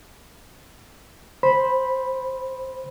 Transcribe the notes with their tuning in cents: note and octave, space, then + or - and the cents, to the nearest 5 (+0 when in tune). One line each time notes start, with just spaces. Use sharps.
C5 +0 B5 -5